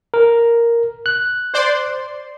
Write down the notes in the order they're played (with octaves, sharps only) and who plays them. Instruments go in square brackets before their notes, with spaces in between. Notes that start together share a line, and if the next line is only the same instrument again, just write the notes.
[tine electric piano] A#4
F#6
[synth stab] C5 D5 C6